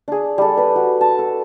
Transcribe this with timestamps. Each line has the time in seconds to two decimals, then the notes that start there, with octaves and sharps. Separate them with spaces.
0.08 D4 G#4
0.38 G3 A4
0.57 B4 B5
0.76 F#4
1.01 A5
1.19 A4